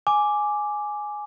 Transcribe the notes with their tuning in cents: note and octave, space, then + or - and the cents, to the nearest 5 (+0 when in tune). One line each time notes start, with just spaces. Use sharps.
G#5 +5 D6 +0